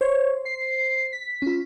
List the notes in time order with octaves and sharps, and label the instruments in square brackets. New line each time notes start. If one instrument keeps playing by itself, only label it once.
[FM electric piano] C5 [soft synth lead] C#5
[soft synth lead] C7
B6
[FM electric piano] C#4 F4